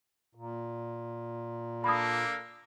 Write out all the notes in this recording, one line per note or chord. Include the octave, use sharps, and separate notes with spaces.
A#2
A#3 D4 A4 B5 D#6